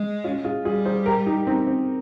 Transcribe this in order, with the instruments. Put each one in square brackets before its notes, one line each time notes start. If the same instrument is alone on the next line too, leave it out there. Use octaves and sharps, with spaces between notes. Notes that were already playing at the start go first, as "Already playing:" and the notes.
Already playing: [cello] G#3
[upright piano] C#4 F4
F4 G#4
[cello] G3 [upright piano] F4 G#4
[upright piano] G#4 C5
G4 A#4
D#4 G4
C4 D#4
C4